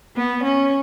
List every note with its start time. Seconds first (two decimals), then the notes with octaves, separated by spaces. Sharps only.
0.16 B3
0.43 C#4